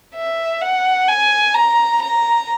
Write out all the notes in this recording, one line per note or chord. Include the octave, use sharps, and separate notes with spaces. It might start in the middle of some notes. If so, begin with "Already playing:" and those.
E5
F#5
G#5
A#5
A#5